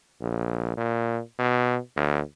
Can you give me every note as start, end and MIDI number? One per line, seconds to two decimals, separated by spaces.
0.21 0.72 34
0.77 1.20 46
1.39 1.78 47
1.96 2.20 38